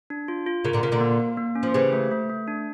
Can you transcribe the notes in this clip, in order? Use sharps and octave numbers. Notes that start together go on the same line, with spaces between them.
D4
F4
F4
C#3 A#4
A#2 D3
C#3 A#4
A#2 D3
A#3
A#3
A#3
C#4
F3
C#3 E3 G4
A3
A3
A3
D4